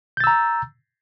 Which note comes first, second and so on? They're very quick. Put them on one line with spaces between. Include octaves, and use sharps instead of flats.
G6 A6 E6 A#5